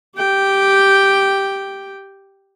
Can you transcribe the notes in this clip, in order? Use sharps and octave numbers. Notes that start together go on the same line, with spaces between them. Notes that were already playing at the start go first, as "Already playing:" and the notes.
G4 G5